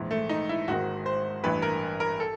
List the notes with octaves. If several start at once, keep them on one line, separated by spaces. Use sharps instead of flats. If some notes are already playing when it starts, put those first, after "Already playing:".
Already playing: A#1 G#2 E3
A3
D#4
E4
G#1 G#2 D#3 F#4
C5
A1 G2 E3 B4
A#4
A#4
A4